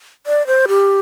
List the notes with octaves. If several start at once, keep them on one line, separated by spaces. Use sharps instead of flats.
D5
C5
G4